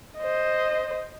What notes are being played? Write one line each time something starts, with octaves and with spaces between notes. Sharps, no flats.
C5 D#5